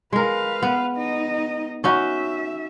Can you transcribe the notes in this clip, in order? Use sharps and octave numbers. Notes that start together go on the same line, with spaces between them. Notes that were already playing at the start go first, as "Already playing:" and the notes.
G#3 A#4 B4 F5
B3
D#4 D#5
C#4 D#4 F#4 E5